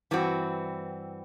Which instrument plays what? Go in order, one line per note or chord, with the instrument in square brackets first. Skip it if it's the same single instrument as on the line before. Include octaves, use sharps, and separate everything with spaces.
[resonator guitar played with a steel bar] G2 E3 C4 F#4